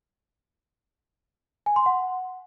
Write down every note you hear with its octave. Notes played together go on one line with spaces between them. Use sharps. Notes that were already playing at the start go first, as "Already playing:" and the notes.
G#5
C6
F#5